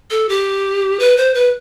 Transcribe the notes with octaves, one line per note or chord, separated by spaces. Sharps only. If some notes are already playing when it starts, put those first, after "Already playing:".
A4
G4
B4
C5
B4